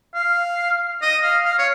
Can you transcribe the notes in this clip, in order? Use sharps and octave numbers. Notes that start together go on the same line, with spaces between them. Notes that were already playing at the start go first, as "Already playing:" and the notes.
F5
D#5
F5
F5
C#5